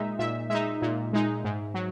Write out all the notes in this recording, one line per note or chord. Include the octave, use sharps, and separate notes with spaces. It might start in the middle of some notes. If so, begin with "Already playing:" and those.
Already playing: A#2 G#3 D#4 E5
A#2 E5
G#3 D#4 E5
A#2
G#3 D#4
G#2
F#3